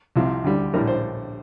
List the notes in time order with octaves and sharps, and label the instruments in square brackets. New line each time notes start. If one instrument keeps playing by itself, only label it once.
[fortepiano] C2 C3 F3
D2 D3 G3
A#1 A2 G3 A#4
C5